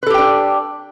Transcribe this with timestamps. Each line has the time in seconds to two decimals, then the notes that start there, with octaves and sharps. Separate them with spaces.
0.03 B4
0.07 A4
0.10 G4
0.14 G5
0.18 D4